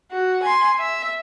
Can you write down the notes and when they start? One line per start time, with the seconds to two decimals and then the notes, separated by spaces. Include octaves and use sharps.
0.11 F#4
0.43 G#5 C6
0.79 E5